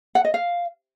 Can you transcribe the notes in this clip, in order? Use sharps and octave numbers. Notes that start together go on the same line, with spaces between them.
F#5
D#5
F5